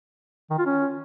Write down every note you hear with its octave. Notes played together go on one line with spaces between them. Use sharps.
D#3
F4
C#4